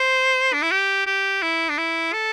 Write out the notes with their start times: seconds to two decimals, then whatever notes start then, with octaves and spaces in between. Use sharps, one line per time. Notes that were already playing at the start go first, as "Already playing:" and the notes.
Already playing: C5
0.53 D4
0.63 E4
0.71 G4
1.07 G4
1.42 E4
1.69 D4
1.78 E4
2.13 A4